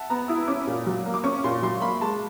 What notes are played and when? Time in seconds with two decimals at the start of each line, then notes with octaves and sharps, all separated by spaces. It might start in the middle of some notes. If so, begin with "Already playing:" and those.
Already playing: E5 F#5 A5
0.10 B3 A#5
0.28 E4 D#6
0.48 C#4 D6
0.67 A#2
0.86 F#3
1.06 A#3
1.14 D6
1.24 C#4 C#6
1.44 A#2 C6
1.62 F#3 C6
1.81 A#3 B5
2.01 G#3 A5